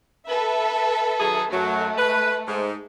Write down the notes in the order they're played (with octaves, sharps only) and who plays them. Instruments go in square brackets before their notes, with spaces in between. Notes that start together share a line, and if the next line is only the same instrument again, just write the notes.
[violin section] A4 B4 E5
[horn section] D#3 F#3 G#4
[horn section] F#2 F#3 [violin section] A3
[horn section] B4
G#2